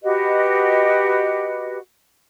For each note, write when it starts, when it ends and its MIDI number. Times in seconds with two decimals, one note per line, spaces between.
0.01 1.77 66
0.01 1.77 67
0.01 1.77 71
0.01 1.77 75